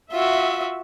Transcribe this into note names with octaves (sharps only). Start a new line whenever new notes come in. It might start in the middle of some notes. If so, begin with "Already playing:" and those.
F4 F#4 E5